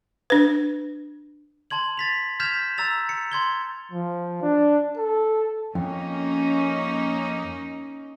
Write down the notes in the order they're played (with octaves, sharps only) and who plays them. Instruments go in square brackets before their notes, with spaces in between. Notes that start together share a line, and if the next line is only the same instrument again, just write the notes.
[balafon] D4 B4
[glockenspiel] A5 C6 G#6 F#7
A6 B6 F7
F6 G6 G#6 B6 E7 F7
A#5 E6 A6 F7
C#7
C6 G#6 G7
[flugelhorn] F3
D4
A4
[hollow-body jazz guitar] F2 [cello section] A#3 C#4 D#4